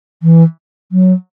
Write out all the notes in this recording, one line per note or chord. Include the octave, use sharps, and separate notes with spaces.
E3
F#3